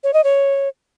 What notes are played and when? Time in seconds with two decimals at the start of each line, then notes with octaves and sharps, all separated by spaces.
0.04 C#5
0.13 D#5
0.24 C#5